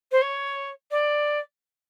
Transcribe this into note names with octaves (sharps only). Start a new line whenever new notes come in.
C5
C#5
D5